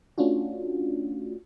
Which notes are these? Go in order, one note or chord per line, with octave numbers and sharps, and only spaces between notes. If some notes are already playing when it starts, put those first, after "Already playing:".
A3 C#4 D4 F4 F#4